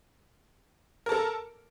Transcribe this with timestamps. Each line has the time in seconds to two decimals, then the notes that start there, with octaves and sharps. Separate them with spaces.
1.06 A#4
1.09 A5
1.12 A4